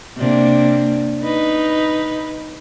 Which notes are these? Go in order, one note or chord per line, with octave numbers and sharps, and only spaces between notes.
C3 A#3 D4
D#4 B4